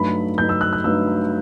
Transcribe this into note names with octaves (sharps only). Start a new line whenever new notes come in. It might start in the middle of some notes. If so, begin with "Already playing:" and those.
Already playing: G2 F#3 A3 D#4 B5
G2 F#3 A3 D#4 G6
E6
F#6
F#6
G2 F#3 A3 D#4 E6